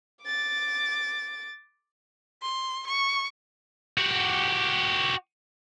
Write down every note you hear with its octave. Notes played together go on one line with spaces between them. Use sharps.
D6 A6
C6
C#6
F#4 G4